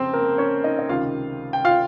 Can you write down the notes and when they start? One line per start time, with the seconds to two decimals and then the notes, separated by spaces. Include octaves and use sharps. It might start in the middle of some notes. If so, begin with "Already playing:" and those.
Already playing: F2 C#3 C4 C5
0.13 A#3 A#4
0.38 C#4 C#5
0.64 D#4 D#5
0.79 D#5
0.89 C#2 C3 D#3 F4 F5
1.53 G5
1.65 F4 F5